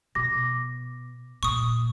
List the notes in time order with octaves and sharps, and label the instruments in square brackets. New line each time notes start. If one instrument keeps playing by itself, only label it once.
[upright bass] B2 [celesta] D6 A#6
[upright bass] A#2 [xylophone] C#6 D#6